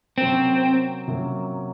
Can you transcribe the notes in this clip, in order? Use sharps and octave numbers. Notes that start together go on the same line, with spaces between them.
C3 F#3 A#3 C4 C#4
C3 F#3 A#3 C#4